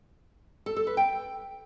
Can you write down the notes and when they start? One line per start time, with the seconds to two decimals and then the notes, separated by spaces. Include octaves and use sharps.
0.66 A4
0.77 A4
0.87 B4
0.97 G5